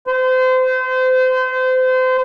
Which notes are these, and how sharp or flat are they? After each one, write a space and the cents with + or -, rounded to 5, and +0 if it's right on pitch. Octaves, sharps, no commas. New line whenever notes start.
C5 -30